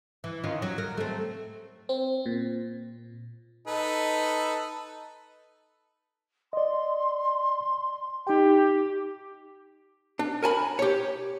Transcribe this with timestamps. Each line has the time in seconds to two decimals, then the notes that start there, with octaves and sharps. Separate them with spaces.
0.24 E3
0.44 D#3 C#4 F4
0.62 F#3
0.78 A#4
0.97 A3 C4
1.89 C4
2.26 A#2
3.67 D#4 A4 B4
6.53 D5 D#5 C6
8.27 D#4 G4 G5
10.19 D4
10.42 A#4 G#5 A5 B5
10.79 G4 C#5